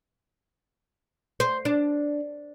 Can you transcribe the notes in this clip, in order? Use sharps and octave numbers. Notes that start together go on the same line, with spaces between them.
C5
D4